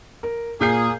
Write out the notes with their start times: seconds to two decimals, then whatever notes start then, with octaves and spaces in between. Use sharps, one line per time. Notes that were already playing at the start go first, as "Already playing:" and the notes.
0.23 A#4
0.61 A#2 A#3 G#4 G6 C7